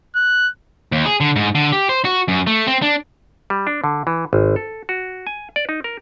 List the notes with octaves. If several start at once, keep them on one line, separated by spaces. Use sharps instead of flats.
F#6
D#2
G#4
D3
G#2
D3
G4
C5
F#4
F#2
A3
C4
D4
G3
D4
D3
E3
G#1
A4
F#4
G#5
D5
D#4
A#4